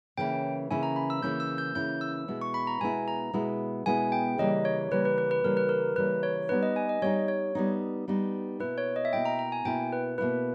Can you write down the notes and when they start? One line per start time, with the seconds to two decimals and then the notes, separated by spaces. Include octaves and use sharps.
0.17 C#3 E3 A#3 C#4 E4 G5
0.71 C#3 E3 A#3 C#4 E4 G#5
0.83 A#5
0.96 B5
1.10 E6
1.23 C#3 E3 A#3 C#4 E4 G6
1.40 E6
1.58 G6
1.75 C#3 E3 A#3 C#4 E4 G6
2.01 E6
2.28 B2 G#3 B3 E4
2.41 C#6
2.54 B5
2.67 A#5
2.81 B2 G#3 B3 E4 G#5
3.08 A#5
3.33 B2 G#3 B3 E4
3.86 B2 G#3 B3 E4 G#5
4.12 G5
4.38 C#3 E3 G3 A#3 D#5
4.65 C#5
4.91 C#3 E3 G3 A#3 B4
5.05 B4
5.18 B4
5.31 B4
5.44 C#3 E3 G3 A#3 A#4
5.57 B4
5.69 A#4
5.96 C#3 E3 G3 A#3 B4
6.23 C#5
6.49 G3 B3 D#4 B4
6.63 D#5
6.76 G#5
6.89 D#5
7.02 G3 B3 D#4 C#5
7.28 C#5
7.55 G3 B3 D#4
8.08 G3 B3 D#4
8.60 B2 A#3 E4 B4
8.78 C#5
8.96 D#5
9.05 E5
9.13 B2 A#3 E4 G5
9.25 A#5
9.39 A#5
9.52 G#5
9.65 B2 A#3 E4 G5
9.93 B4
10.18 B2 A#3 E4 B4